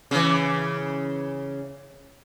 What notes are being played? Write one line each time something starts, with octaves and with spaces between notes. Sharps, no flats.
C#3 E3